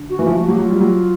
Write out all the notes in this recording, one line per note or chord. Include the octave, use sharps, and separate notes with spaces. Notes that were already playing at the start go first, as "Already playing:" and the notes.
Already playing: D3
F#4
E3
F3 F#4
F3 F#4
F#3 G4
F#3 F4
G3
F#3